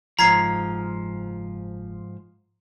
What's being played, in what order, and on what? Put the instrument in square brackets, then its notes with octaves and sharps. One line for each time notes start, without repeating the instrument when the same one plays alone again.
[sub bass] F#1 [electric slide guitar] G#2 F3 [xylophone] A#5 G#6 C7